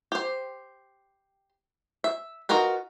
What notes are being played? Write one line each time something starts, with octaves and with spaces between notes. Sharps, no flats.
G4 C5
E5
D#4 F4 F#4 A#4 B4